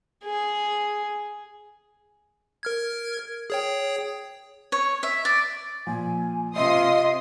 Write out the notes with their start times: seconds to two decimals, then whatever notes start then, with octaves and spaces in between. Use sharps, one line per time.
0.24 G#4
2.63 A#4 F6 G#6
3.50 G#4 C#5 G5
4.72 C#5
5.03 E5
5.25 D5
5.87 A#2 F3 G#5
6.56 C3 F4 D#5 E5 C6 D#6